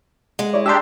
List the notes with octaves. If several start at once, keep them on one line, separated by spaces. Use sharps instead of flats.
G#3 F#5
E4 C#5 D5
D4 G4 G#4 A#5 C6 E6